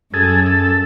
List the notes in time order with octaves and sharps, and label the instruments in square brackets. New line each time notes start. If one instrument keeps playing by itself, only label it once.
[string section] F#2 [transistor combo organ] G#4 A4
[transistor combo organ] A4